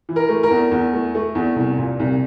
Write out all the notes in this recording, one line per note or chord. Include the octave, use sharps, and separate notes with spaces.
E3
A#4
A3
A#4
E2
E2
A3
A3
E2
C2
A#2
C2